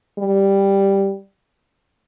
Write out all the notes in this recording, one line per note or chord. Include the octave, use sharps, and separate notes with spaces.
G3